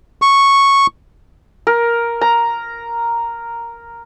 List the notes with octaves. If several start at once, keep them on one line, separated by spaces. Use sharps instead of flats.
C#6
A#4
A#5